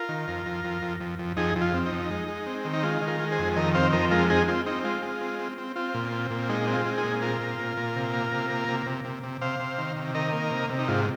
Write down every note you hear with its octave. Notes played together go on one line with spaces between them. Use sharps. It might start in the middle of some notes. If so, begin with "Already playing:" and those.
Already playing: F4 A#4
D#3
F2
F2
F2
F2
F2
F2
F2 D#4 G#4
F2
F4
C4
D#4
F2
G#3
G#3
C4
D#3
D#4
G#3 F4
D#3
F4 A#4
G#3
G#4 C5
F2
D#3 A#4 D#5
C4 C5 F5
F2 A#4 D#5
G#3 F4 A#4
C4 D#4 G#4
C4 F4
C4 D#4
G#3 F4
G#3
C4
C4
C4
C4 F4
A#2
C4
A#2
G#3 D#4
C4
F4
G#3
D#4 G#4
A#2
C4 F4 A#4
A#2
A#2
A#2
C3
A#3
C3
A#3
C3
C3
C3
C3
C3 C5 F5
C3
D#3
C3
D#3 A#4 D#5
A#3
C3
C3
D#4
G#2 F4